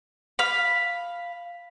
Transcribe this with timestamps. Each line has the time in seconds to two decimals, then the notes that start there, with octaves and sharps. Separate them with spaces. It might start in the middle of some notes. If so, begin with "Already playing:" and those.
0.39 F5 B5